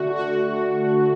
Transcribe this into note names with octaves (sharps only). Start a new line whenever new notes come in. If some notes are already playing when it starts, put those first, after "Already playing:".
Already playing: D3 A3 F#4
F#4